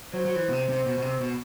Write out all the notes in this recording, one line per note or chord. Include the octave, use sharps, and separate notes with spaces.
F#3 C5
F#3
E3
B2
C3
C3
B2
B2
C3
B2